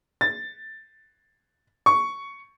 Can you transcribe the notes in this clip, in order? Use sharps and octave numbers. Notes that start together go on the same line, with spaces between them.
A6
C#6